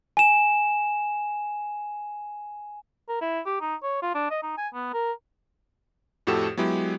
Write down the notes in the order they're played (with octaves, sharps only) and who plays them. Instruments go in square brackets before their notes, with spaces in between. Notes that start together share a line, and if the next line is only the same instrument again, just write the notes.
[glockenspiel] G#5 E7
[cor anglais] A#4
E4
G4
D#4
C#5
F4
D4
D#5
D#4
G#5
B3
A#4
[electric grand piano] F2 A2 F#4 G4 A4 E7
F#3 G#3 B3 E4 G4